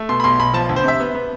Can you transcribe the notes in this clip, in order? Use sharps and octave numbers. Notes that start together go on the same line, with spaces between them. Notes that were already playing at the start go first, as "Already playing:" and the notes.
Already playing: A3
B2 C6
B5
B1 C6
B1 B5
F3 A5
D2
C5
C3 E5
B3
B3